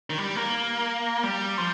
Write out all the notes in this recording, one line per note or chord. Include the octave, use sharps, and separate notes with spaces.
D#3
G3
A#3
G3
F3